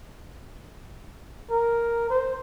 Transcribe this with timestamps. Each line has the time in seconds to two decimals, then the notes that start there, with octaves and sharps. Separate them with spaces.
1.50 A#4
2.10 C5